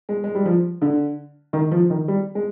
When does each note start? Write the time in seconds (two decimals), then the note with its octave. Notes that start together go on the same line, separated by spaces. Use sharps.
0.09 G#3
0.24 G#3
0.35 G3
0.45 F3
0.82 D3
1.53 D#3
1.71 F3
1.90 D#3
2.08 G3
2.35 G#3